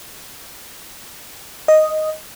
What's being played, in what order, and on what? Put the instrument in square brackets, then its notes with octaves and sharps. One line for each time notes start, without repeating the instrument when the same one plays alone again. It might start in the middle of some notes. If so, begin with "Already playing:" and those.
[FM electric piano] D#5